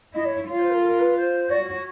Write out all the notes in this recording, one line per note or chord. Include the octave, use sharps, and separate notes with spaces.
E4 D#5
C#5
F4 C#5
C5
A#4
A#4
B4
C5
F#4 D5
C#5
C#5